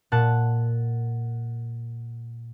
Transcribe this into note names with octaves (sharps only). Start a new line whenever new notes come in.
A#2 F#5 A5